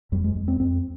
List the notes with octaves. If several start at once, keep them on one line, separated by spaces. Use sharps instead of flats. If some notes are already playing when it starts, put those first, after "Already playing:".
F2 G3
G#3
F2
C4
F2 C4